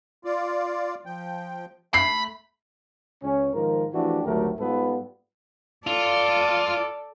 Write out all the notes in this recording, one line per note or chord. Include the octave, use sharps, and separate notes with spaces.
F4 D5
F3 G5
A3 B5 C7
C#2 C#4
G#2 D#3 F3 A#4
E3 F3 A3 D4 F#4 G4
G#1 D2 F#3 A3 G4 A#4
G#2 G3 B3 F4 A4 B4
F4 A4 D5